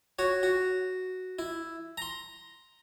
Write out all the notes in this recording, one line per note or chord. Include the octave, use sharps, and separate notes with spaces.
F#4 C#5
F#4
E4
A#5 C6